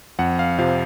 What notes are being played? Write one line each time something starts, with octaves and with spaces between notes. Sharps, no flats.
F2 F#5
F5
C3 F3 F5